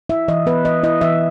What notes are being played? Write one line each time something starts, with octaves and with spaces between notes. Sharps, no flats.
E4 E5
E3 D#5
B3 B4
E3 D#5
E4 D#5
E3 E5